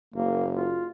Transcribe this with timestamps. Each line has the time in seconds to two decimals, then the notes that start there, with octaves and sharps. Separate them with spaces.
0.14 F#1 A#3
0.54 F4